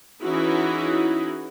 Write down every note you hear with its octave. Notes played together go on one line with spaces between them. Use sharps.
E3 C#4 D#4 E4 F#4 G#4